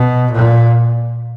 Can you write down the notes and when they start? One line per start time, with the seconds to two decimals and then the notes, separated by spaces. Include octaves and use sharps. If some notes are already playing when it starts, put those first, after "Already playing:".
Already playing: B2
0.32 A#2